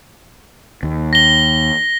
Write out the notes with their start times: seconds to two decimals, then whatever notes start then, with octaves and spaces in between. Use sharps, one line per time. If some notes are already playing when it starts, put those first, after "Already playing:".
0.83 D#2
1.13 A#6 G7